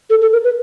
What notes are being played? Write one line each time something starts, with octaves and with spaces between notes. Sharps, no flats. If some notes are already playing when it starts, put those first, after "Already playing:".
A4
A4
A#4
B4